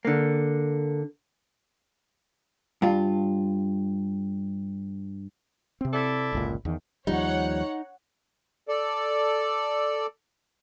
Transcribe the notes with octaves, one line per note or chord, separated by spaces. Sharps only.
D3 A#3
G2 F4
C3 C4
E4 A4 D5
G1 C#2 A#2
E2 D#3
D#2 F3 G3 D#4 C#5 F#5
A4 D5